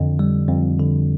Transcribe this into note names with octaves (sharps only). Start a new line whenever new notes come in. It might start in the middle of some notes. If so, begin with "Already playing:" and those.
Already playing: F2 D3
G3
F2
D3